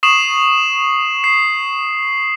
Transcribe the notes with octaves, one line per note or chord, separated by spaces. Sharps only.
C#6 D#6 C7 E7 F#7
C7